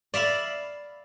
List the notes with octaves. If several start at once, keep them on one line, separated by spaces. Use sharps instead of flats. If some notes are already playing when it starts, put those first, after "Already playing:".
D5 E5 F5 B5